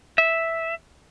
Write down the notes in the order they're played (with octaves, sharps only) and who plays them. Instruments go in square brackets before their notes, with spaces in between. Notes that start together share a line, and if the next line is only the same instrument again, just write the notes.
[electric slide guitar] E5